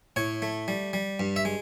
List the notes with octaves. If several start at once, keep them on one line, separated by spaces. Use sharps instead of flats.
A2 C#5
A3
G3
G3
G2
E5
G#3